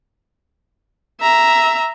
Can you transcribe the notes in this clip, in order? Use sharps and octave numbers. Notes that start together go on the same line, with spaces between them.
E5 A#5